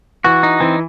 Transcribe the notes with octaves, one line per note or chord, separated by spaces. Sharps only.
E3 F#4
D#4
E3 C4